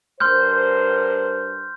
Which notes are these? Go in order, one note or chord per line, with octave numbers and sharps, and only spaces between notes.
G2 A#4 C5 C6 F6 G6